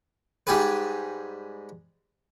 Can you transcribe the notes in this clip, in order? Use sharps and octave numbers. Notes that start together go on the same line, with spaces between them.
G#2 G3 G4 G#4 B4